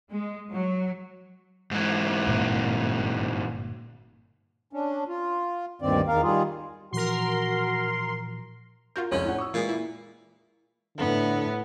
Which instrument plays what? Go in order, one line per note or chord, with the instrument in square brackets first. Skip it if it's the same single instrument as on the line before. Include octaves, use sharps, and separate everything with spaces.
[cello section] G#3
F#3
[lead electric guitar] G#2 E3
[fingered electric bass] G1 A#2 A#3
[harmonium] C#4 D4
F4
D2 G2 A#2 D#3 C4 D5
E2 D#3 A#4 F5
D#3 G3 F4 G#4
[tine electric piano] A#2 E3 F3 [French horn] F#4 [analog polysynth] A#4 C6
[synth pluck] F4 F#4 A#4 [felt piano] G6
[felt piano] F1 C#2 [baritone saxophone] C#4
[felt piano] A2 D4 F#5
C#6 D#6 E6
[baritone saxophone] A#2 [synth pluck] E3 G#3
[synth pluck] A#3 E4
[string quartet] A2 B3 [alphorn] D3